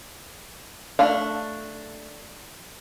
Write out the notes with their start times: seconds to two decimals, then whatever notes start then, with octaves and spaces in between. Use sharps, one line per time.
0.99 A3 D4 F5